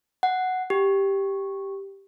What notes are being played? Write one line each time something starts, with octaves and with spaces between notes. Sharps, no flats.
F#5
G4